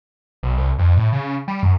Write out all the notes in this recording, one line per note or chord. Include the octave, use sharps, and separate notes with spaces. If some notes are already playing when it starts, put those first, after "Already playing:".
B1
C2
F2
A2
C#3
G3
F#2